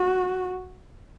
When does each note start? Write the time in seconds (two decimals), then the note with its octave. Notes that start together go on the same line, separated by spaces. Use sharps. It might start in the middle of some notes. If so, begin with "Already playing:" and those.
Already playing: F#4